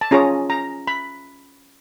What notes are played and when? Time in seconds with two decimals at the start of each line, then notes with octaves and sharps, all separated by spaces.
0.01 A5
0.11 C#4 F4 G#4 C#5 A#5
0.50 A#5
0.87 B5